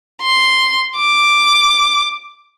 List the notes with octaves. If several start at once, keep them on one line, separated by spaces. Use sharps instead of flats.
C6
D6